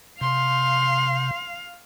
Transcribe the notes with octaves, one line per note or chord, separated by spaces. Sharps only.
C3 F5 C6